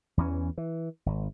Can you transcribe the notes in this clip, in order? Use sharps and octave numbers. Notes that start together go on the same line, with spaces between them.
E2 E3 C#4
E3
G#1